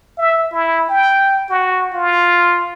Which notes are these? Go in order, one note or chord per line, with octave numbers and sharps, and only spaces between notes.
E5
E4
G5
F#4
F4